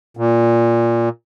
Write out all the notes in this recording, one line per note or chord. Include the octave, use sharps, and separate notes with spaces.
A#2